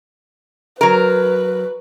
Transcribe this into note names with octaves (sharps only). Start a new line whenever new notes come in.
F#3 A#4 B4